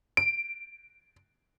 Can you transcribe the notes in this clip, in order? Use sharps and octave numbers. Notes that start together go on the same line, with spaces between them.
D7